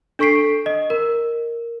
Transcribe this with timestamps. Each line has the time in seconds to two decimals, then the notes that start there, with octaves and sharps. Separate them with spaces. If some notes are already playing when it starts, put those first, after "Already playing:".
0.19 D4 A4 C#6 B6 C7 D7
0.66 D#5
0.90 A#4